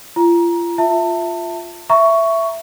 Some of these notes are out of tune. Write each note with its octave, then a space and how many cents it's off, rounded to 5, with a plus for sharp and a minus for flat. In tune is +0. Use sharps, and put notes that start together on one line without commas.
F4 -35 A#5 +15
F4 +0 E5 +5 A5 +30
E5 +10 A#5 +0 C#6 +10